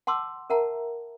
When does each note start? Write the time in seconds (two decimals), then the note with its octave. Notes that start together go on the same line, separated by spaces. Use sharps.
0.07 F#5 A5 C6 D6 E6
0.50 A#4 E5 F#5 A5 A#5